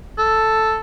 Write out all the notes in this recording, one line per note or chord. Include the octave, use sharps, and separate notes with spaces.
A4